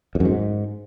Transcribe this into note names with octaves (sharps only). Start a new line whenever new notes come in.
F2
F#2
G#2